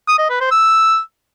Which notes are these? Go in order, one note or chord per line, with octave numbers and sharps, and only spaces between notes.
D#6
D#5
B4
C5
E6